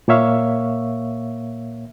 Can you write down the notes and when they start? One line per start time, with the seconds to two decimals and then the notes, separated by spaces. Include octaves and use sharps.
0.08 A#2 A#3 C#5 E5 F5 C#6